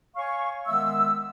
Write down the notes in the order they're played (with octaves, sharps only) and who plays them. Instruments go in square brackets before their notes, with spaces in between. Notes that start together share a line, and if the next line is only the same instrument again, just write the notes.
[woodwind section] C#5 F5 G#5 C#6
D#3 G#3 B3 E5 E6